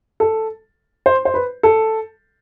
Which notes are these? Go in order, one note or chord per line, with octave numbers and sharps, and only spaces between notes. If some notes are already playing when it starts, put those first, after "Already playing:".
A4
C5
C5
B4
A4